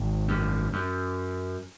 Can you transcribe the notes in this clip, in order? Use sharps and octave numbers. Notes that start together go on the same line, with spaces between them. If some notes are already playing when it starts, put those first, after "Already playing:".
Already playing: G#1
F#2
F#2